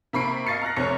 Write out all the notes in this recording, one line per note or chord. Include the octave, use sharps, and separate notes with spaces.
C3 A#3 B5 C#6 C7 D7
D#5 F5 C#6 A6 C7 C#7
A#5 F6 F#6 A#6
F1 C3 C5 C#5 A#5 C#7